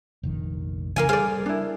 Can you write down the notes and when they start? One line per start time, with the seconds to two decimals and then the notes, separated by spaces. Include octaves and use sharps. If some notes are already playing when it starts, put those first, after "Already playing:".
0.23 F1 A#1 D#3
0.96 C#3 E3 A#3 F5 G#5
1.09 G3 G#4 A4 C5 D5 F5
1.46 D4 E4